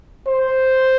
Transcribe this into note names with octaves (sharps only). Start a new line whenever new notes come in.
C5